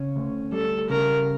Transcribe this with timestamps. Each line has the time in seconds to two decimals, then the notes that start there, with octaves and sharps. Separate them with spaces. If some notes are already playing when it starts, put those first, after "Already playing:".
Already playing: C#3 C#4
0.16 D2
0.52 G3 A4
0.89 C#3 A#4